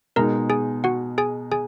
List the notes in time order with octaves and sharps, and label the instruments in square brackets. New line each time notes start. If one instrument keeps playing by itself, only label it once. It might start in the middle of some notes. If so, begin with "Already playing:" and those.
[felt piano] B2 G#3 D#4 [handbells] A#4 A#5
[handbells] G#4 G#5
F#4 F#5
G#4 G#5
G#4 G#5